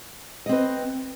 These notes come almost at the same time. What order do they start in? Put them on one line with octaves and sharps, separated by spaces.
D#5 C4 B4